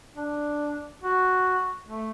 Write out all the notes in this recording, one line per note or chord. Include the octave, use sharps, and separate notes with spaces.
D4
F#4
A3